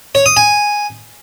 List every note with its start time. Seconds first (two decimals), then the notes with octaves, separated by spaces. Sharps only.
0.15 C#5
0.26 D#6
0.37 G#5